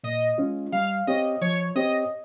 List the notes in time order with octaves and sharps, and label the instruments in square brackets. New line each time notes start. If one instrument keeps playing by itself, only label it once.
[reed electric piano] A#2 [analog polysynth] D#5
[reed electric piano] G#3 C#4 F4
[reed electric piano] G3 [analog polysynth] F5
[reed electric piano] C4 G4 C#5 [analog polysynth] D#5
[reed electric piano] F3 [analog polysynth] C#5
[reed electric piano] C4 G4 C#5 [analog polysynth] D#5